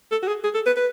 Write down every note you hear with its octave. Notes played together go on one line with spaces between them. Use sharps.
A4
F#4
G#4
G#4
A4
B4
B4